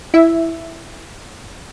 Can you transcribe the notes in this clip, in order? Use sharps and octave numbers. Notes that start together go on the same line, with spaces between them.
E4 E5